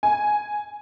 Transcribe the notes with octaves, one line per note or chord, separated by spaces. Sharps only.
G#5